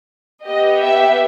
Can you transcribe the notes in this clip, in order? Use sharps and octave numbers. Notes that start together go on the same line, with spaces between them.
B3 G4 D#5
E5